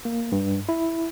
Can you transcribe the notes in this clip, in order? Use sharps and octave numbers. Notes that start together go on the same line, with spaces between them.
A#3
G2
E4